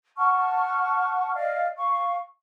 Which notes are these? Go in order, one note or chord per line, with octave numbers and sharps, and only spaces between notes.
F#5 A5 C#6 F6
D5 D#5 F5 F6
F5 C#6